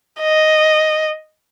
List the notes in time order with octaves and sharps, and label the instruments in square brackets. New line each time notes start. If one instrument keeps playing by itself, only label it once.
[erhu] D#5